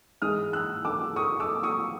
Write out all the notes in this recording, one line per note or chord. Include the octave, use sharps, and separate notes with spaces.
G#2 E3 G#3 D#6 F6
E6 F#6
D6 E6
C#6 D#6
D6 E6
C#6 D#6